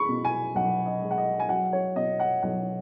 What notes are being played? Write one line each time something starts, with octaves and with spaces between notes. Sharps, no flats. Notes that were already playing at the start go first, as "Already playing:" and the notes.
Already playing: G#3 B5 C#6
B2
G#5
B1 F#5
D#5
G#3
F#5
D#5
G#5
F#3 F#5
C#5
B2 D#5
F#5
B1 F#5